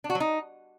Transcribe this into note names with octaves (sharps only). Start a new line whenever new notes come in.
D4
F#4
F#3
D#4